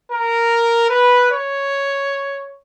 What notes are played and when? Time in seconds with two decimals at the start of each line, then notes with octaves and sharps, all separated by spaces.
0.12 A#4
0.90 B4
1.30 C#5